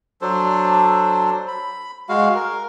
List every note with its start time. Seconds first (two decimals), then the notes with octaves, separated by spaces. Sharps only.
0.21 F#3 D4 A4 C5
1.48 B5
2.09 G#3 F#4 F5
2.35 A#4